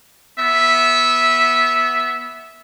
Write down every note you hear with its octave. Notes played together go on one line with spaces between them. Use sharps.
B3 E5